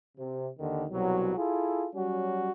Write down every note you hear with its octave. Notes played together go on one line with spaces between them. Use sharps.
C3
D#2 D3 D#3
C2 B2 F#3
E4 F4 G#4 A4
F#3 G3 C#4 F#4